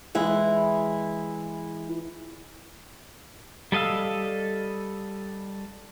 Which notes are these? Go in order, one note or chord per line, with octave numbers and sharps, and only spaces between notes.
E3 G#3 E4
G3 A4 D#5 F5 E6